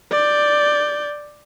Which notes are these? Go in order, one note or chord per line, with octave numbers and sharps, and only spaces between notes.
D5 G6